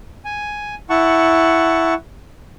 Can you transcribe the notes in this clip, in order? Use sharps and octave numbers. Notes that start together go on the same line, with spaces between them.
G#5
E4 F#5 A5 C#6